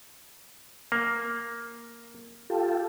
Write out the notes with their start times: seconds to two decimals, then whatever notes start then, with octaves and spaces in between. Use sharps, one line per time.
0.92 A#3
2.50 F4 G4 A4